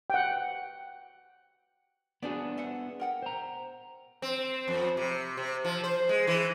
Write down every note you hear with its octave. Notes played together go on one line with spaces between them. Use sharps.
F#5 G5
B3 D4 F#4 G#4 C5 D5
A4 E5 F#5
A#4 F#5 G5
C5 A#5
C4
F2
C3
C3
F3
C5
G#3
E3